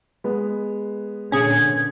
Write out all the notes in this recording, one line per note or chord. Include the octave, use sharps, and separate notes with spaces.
G#3 B3
A#2 D3 C#4 G#4 G#6